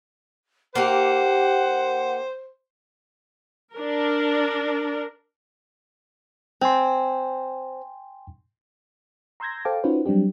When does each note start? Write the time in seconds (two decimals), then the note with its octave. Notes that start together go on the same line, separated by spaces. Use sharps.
0.75 A#3 D#4 G4 C5 F#5
3.74 D4 A#4
6.61 C4 G5 G#5 C6
9.40 A#5 C6 E6 G6 G#6 A#6
9.65 A4 C5 F5 G5 A5 D6
9.84 C#4 D#4 F4 F#4 B4 C5
10.05 F#3 G3 C4 D4 G4